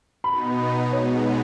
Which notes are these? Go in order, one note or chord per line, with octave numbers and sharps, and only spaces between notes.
B2 B3 D#4 B5
B2 G#3 B3 D#4 C#5